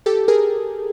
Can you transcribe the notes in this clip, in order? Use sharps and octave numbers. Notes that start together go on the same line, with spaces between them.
G4 A4
G#4 A#4